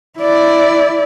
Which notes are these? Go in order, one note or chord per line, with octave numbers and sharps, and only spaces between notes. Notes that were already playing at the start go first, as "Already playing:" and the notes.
E4 D5